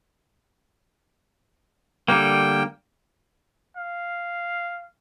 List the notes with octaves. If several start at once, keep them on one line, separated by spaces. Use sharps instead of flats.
D3 G3 A#3 G5
F5